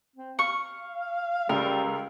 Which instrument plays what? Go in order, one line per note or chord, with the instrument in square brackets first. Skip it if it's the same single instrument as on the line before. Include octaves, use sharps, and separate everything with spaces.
[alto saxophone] C4
[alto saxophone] F5 [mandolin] C#6
[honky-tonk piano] C#2 [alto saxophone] G3 [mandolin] A#4